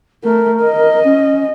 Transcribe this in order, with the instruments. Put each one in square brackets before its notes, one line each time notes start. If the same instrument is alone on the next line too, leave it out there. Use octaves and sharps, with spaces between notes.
[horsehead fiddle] A3 [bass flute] A#4
[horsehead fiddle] D#5
[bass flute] C#4